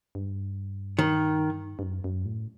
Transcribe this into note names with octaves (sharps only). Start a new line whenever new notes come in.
G2
D#3
G2
F#2
F#2
A2